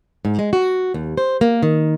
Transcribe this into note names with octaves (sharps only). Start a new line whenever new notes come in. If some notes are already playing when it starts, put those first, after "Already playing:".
G#2
G#3
F#4
D#2
C5
A#3
D#3